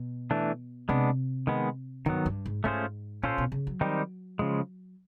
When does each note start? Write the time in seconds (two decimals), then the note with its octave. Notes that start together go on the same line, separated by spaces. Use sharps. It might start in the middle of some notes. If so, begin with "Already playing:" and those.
Already playing: B2
0.31 E3 A3 D4
0.89 C3 G#3 B3 D4
1.47 D#3 G#3 B3
2.06 G2 D#3 F#3 B3
2.26 G2
2.46 G#2
2.64 G#2 A3 C#4 F4 G#4 C5
3.23 A#2 C#4 F4 A4 C5
3.38 B2
3.52 C#3
3.67 F#3
3.81 D#3 G3 C4 D#4 G4
4.39 C#3 F3 G#3